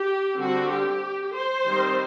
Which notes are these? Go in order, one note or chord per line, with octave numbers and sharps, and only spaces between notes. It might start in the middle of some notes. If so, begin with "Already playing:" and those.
Already playing: G4
D3 G3 C4 F#4
G4
C5
D#3 G3 C4 D#4